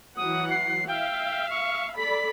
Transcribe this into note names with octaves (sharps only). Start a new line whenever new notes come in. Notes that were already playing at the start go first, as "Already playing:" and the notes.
E3 F#3 F#5 D#6
C7
E5 F5 G5
C#6
A4 D5 B5 B6